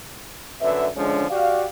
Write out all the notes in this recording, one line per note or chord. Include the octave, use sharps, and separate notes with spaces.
F#2 D3 B4 E5
D3 F3 G#3 C#4 D4
F#4 G4 D5 F5